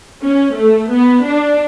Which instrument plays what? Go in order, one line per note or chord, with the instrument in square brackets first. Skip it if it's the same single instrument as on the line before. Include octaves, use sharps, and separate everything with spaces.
[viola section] C#4
A3
B3
D4